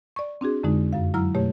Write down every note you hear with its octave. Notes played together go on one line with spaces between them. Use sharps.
D5 C#6
C4 D4 F#4 G#4
F2 D3 G#3 D#4
F#2 F5
F#3 E4 A#5 F6
B2 A3 G4 C#5